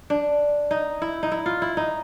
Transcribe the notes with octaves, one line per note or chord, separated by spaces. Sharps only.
D4
D#4
E4
D#4
E4
F4
E4
D#4